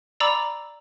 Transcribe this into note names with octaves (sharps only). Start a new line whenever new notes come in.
D5 A#5 B5 D6 E6 A6